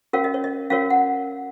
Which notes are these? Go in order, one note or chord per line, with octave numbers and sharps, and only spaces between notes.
C#4 F#4 A#4 C#5 F5
D#5
C#5
D#5
C#4 F#4 A#4 C#5 F5
F#5